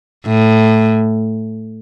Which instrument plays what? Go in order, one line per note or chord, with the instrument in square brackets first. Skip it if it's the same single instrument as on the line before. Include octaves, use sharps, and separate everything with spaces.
[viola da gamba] A2